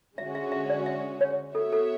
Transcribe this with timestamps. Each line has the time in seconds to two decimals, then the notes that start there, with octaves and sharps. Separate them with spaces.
0.18 D3 G#3 C#4 F#4 E5
0.35 E5
0.52 E5
0.70 D5
0.86 E5
1.21 C#5
1.55 B3 F#4 A4 C#5 E5
1.73 A4